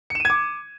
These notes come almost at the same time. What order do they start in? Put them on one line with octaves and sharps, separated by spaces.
C#7 E7 D#7 G#6 D6